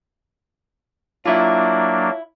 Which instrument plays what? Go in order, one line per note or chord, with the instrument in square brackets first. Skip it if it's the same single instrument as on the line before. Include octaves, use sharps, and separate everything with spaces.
[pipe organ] F#3 A#3 D4 [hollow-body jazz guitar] E4 F4